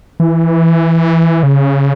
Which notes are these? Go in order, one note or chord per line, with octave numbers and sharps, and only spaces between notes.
E3
C#3